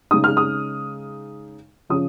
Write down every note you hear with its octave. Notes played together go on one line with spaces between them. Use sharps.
C#3 G#3 D#4 D#6
F6
D#6
C#3 F3 C#4 D#6